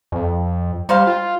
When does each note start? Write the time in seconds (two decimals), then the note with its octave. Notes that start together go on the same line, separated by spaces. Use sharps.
0.12 F2
0.89 G3 D#4 C5 F5
1.07 F4